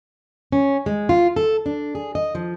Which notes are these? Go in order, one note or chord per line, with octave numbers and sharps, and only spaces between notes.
C#4
G#3
F4
A4
D4
G#4
D#5
F3